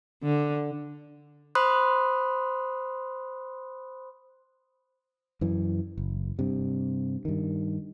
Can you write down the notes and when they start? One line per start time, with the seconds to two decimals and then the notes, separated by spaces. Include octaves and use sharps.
0.23 D3
1.55 C5 B5 C6 D#6 F#6
5.41 F#2 E3
5.98 F#1
6.39 G2 C3
7.25 G2 D#3